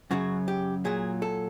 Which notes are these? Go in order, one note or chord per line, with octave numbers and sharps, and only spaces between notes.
F#2 C#3 F#3 F#4
G4
A#2 F#3 G#4
A4